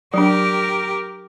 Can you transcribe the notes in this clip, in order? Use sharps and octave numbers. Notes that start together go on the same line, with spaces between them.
F#3 D4 G4 A#4